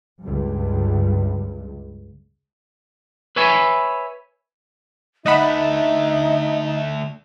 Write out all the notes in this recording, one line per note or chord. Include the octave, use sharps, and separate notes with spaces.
C#2 G2
B4 C#5 E5 G#5 B5
D3 A3 D#4 D#5 E5 F#5 B5